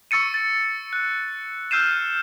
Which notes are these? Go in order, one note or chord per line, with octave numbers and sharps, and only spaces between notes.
C#6 E6 A6 C#7 D#7
A6
F#6
E6 F6 G6 C7 D#7 E7